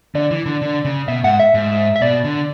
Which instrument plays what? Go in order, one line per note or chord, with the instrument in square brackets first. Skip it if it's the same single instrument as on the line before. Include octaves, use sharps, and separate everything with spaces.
[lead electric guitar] D3 [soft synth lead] D5
[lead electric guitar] E3
D3
D3
C#3
[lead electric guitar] B2 [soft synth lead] E5
[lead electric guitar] G#2 [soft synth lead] F#5
[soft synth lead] E5
[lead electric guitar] G#2
[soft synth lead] E5
[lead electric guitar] B2 [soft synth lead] D5
[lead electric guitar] D3